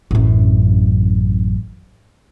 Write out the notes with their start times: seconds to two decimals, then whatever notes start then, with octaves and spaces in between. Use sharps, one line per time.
0.11 A1 F#2